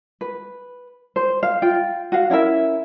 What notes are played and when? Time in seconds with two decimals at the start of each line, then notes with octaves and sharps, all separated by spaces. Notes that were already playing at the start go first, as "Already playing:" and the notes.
0.21 B4
1.16 C5
1.43 F5
1.62 F4 G5
2.12 F#4 F5
2.30 C#4 E4 A#4 E5